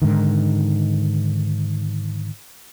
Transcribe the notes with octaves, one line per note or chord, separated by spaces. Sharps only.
G#2 D3 D#3